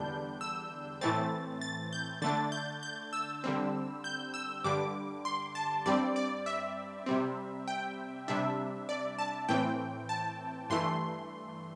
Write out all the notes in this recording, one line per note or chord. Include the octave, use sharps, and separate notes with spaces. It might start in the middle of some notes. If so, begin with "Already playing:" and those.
Already playing: E2 D3 G3 D4 G6
E6
A2 E3 A3 C4 A6
A6
G6
D3 A3 D4 A6
G6
G6
E6
D3 G3 C4
G6
E6
G2 D3 G3 D6
C6
A5
G2 G3 C4 D5
D5
E5
C3 G3 C4
G5
C3 G3 D4 E5
D5
A5
A2 E3 C4 G5
A5
G2 E3 A3 C6